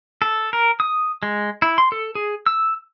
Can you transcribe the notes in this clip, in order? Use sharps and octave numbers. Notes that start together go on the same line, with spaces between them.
A4
A#4
D#6
G#3
E4
C6
A4
G#4
E6